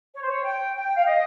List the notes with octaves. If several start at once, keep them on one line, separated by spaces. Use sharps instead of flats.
C#5
C5
C#5
G5
G5
F5
D#5